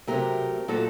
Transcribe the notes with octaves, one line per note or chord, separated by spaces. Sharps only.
C3 F#3 A3 G4 A#4
A#2 F#3 A3 F#4 A4